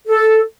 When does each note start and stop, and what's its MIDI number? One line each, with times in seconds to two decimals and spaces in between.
0.08 0.41 69